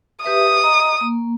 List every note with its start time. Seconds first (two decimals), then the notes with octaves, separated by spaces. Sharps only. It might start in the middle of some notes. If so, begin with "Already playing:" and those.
0.24 G4 B4 E5 D#6
0.63 D#5 A#5
1.01 A#3